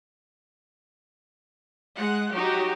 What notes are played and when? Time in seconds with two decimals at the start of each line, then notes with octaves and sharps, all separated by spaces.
1.94 G#3 F#5
2.34 F#3 D#4 F#4 G4